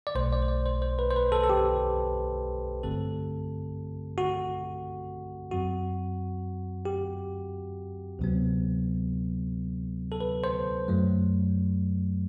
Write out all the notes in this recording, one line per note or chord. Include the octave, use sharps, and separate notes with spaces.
D5
B1 B2 A3 C5
D5
C5
D5
C5
C5
B4
C5
B4
A4
A4
G4
G1 G2 D3 A3 C4 A4
F#4
F#2 F#3 C4 F#4
G4
D2 C3 F#3 B3
A4
B4
C5
F#2 F#3 A3